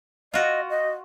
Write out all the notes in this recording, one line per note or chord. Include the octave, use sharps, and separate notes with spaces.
F4 F#4 D#5
D#5